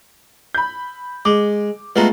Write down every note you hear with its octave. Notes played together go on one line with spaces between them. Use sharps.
B5 G6
G#3 D6
G#3 A3 B3 F4 F#4 A#5